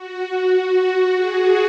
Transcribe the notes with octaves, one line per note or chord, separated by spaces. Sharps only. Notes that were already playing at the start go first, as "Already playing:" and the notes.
Already playing: F#4
F#4
F#4
G#4